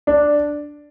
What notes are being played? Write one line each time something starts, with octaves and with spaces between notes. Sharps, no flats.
D4